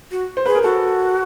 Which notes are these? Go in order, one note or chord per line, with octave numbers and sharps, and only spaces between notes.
F#4
C5
G#4 B4
A#4
F#4 A4